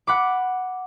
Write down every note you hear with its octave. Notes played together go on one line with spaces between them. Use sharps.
F#5 B5 D6